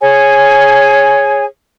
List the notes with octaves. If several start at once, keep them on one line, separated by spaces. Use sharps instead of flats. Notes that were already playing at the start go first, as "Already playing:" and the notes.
G#4 C#5 G#5